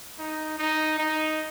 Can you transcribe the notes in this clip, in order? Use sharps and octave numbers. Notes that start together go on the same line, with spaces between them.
D#4
D#4
D#4